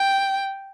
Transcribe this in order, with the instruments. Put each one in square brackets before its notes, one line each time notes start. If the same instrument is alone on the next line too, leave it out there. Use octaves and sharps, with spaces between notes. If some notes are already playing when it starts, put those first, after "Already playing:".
Already playing: [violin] G5